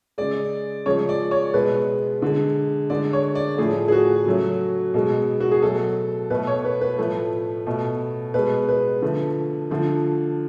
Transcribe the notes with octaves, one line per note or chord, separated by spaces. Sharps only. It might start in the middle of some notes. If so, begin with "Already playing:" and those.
C#3 G#3 D5
C#3 F3 G#3 C#5
D5
C#5
B2 G#3 B4
D3 G#3
D3 G#3 D5
C#5
D5
A2 F3 A3 G#4
G#4
F#4
C#3 F#3 A3
B2 G#3
F#4
G#4
B2 F#3 A3 A4
B2 A3 B4
C#5
B4
B4
A2 F3 A3
B2 A3
B2 G#3 B4
B4
D3 F3 A3
D3 F3 A3